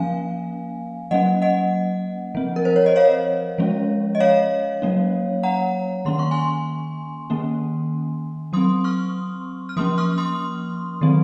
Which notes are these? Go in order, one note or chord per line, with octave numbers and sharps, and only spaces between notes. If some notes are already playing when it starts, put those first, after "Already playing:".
Already playing: F3 A#3 C#4 F5 G#5
F#3 A#3 C#4 D#5 F#5
D#5 F#5
F3 C4
A#4
C5
C#5
D#5
C#5 F5
F3 G#3 C#4
D#5
C#5 F5
F#3 A#3 C#4
F#5 A#5
D#3 A#3 C#4 C6
C#6
G#5 C6
D#3 A#3 C#4
F#3 C4 C6 D#6
C#6 F6
F6
F3 A#3 C#4 C6 D#6
C#6 F6
C6 D#6
D#3 F#3 C4